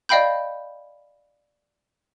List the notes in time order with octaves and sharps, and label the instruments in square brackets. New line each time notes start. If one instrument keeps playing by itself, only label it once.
[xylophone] D5 D#5 F5 G5 B5 G6